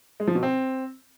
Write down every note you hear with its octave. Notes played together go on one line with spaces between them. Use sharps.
G#3
F3
B2
C4